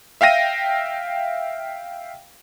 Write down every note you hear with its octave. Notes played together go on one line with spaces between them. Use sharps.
E5 F5 G5 A#6 D#7